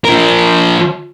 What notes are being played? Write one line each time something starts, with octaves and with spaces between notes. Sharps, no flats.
F3 A#4